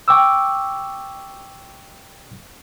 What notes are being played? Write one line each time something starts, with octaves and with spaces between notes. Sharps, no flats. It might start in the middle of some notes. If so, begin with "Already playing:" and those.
G5 C#6 D6 E6